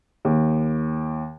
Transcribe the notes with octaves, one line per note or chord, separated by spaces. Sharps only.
D#2